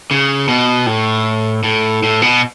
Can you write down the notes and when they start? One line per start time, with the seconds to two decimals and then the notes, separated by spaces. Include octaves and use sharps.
0.11 C#3
0.48 B2
0.87 A2
1.63 A2
2.03 A2
2.22 B2